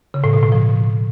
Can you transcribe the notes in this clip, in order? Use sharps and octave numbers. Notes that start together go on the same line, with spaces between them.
C#3
A2
B2
A2
F3